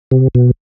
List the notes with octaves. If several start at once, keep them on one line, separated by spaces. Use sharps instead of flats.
C3
B2